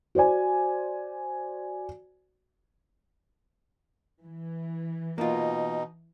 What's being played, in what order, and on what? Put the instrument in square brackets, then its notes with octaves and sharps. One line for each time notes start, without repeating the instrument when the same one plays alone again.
[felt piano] F#4 C5 D5 G#5
[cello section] E3
[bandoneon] B2 D#4 [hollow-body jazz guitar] A#3 F4